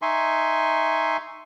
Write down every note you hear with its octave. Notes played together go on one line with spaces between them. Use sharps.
D#4 E5 G#5 C6 C#6